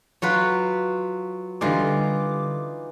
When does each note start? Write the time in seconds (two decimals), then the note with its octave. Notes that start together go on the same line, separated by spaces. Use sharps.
0.22 F#3 F4 B4
1.61 D3 E3 G3 D#4 F4 D6